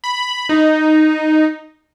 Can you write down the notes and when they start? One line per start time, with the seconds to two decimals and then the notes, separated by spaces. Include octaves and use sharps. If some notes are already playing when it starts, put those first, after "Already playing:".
0.04 B5
0.49 D#4